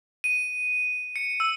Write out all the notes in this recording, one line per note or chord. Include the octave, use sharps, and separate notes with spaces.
D#7
C#7
E6